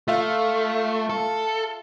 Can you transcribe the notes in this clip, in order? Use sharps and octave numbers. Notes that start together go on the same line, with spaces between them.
A3 F4 E5 F5
A4